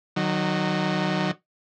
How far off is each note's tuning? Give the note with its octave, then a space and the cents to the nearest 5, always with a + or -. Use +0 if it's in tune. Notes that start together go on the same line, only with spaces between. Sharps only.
D#3 -25 F#3 +0